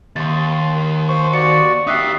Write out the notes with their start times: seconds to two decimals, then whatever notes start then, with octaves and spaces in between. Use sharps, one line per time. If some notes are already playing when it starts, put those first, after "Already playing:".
0.16 D#2 C6 A6
0.53 C6
1.09 C5 C#6
1.34 F#4 D5 C#7
1.87 D#4 G4 E5 D#6 F#6 C7